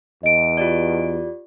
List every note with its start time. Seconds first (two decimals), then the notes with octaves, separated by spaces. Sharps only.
0.23 E2 D#5 D7
0.57 F4 G4 D5